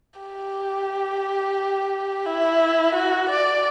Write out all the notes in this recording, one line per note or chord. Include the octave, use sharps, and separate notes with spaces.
G4
E4
F#4
D5